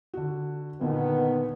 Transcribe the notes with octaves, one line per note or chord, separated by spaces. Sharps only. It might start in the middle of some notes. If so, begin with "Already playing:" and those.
D3 F#4
A#2 D3 D#3 B3